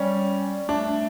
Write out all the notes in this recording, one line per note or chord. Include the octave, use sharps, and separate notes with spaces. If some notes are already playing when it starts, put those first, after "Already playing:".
Already playing: G3 C#4
A3 D4